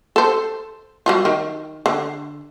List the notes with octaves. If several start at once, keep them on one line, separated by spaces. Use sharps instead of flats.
A4 C5
F#3 G3 F4
D#3
D3